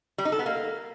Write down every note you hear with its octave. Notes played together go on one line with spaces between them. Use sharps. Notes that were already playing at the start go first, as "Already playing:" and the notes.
G3
D#4
A4
B3
A#3